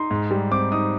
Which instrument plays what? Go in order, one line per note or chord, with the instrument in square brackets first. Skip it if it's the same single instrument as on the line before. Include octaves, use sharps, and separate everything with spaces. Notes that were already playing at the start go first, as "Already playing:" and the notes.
Already playing: [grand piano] D#4 C6
G#2
G3
C4 D6
D#4 D#6